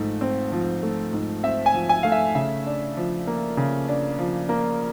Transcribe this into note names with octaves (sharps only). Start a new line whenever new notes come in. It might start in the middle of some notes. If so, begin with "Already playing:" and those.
Already playing: G#2 F3 A3
C4
F3
A3
G#2
C4 E5
G#5
F3
G#5
A3 F5
E5
C#3 E5
D4
F3
A#3
C#3
D4
F3
A#3